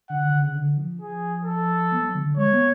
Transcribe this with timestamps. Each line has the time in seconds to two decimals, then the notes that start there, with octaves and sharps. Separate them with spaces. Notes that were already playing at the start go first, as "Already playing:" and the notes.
0.09 D3 F#5
0.25 D3
0.40 C#3
0.55 D3
0.77 F3
1.01 G#4
1.45 A4
1.92 B3
2.03 F#3
2.15 D3
2.26 D3
2.37 G#3 C#5
2.53 B3